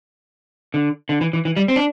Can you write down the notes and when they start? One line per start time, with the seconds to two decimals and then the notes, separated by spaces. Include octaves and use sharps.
0.74 D3
1.09 D3
1.21 E3
1.33 E3
1.45 E3
1.56 G3
1.68 C4
1.76 D4